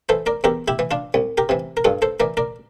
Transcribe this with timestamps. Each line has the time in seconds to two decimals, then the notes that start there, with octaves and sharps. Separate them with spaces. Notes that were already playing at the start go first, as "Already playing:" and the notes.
0.09 E3 A4 C5
0.26 A#4 D5
0.44 E2 G4 A#4
0.68 E4 G4
0.79 E3
0.91 D4 F4
1.14 C2
1.38 G4 A#4
1.49 C3 E3
1.77 A#4
1.85 G2 F4 A4
2.02 A4 C5
2.20 E3 A#4 D5
2.37 A#4 D5